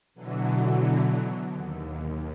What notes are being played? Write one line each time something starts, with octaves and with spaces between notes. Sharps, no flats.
B2 D3 E3 F#3
D#2